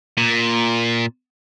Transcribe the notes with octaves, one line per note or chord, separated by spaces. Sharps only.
A#2